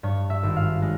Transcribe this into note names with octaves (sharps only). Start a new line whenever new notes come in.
G2 C#5
E5
G#1
F5
G#3